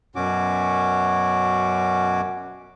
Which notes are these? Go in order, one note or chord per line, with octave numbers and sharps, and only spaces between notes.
F#2 B2 C#4 F#4 D6